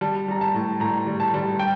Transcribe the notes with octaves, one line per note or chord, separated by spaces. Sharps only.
G3 A5
G3 A#5
A5
A2
A2 A#5
G3
A5
G3
G5